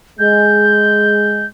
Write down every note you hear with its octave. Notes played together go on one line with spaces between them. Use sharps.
G#3 G6